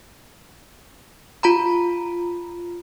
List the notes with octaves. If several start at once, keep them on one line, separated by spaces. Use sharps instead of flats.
F4 A#5 B5